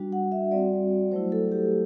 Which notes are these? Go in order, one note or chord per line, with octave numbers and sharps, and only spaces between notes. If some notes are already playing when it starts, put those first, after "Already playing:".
Already playing: G3 D4 F#4
F#5
E5
G3 C4 F#4 D5
F#3 A3 E4 C5
A4
G4